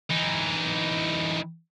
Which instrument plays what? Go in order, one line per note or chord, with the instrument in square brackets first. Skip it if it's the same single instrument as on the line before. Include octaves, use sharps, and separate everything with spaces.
[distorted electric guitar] E3 D#4